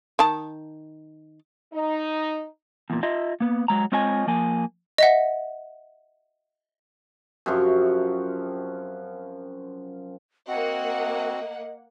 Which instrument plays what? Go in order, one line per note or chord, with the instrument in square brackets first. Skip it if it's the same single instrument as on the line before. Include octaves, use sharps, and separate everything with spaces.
[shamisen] D#3 A5
[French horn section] D#4
[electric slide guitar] E2 A#2
F4 D#5 E5
A#3 B3
F#3 G#3 A#5
G#3 C4 F4 C#5 D#5 G#5
F3 A#3 G#5
[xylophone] D#5 E5 F#5
[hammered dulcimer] F#2 C3 F3 C#6
[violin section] A#3 F#5 [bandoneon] C4 F#4 [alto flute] D#5